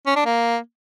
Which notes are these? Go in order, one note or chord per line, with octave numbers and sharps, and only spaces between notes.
C#4
D4
A#3